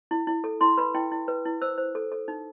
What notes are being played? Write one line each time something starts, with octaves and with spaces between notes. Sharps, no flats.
E4
E4
A4
E4 C6
B4 B5
E4 G5
E4
B4
E4
C5 E6
C5
A4
A4
D#4